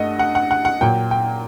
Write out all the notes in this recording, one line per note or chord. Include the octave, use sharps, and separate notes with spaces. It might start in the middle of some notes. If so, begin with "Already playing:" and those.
Already playing: G2 A3 D#5 F#5
F#5
F#5
F#5
F#5
A#2 F#3 A#3 G5
G5